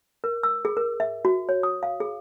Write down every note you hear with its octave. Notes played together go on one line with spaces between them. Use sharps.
A#4
E6
G#4
A#4
E5
F#4
C#5
D#6
F5
G#4